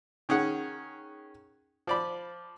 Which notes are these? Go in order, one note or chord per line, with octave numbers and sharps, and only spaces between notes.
D#3 C#4 G#4 F#5
F3 D5 B5